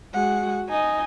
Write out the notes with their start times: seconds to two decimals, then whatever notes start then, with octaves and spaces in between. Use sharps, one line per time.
0.14 G#3 F#4 F#5
0.69 D#4 D#5 G#5